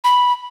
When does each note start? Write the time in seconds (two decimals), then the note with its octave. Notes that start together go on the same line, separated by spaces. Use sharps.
0.04 B5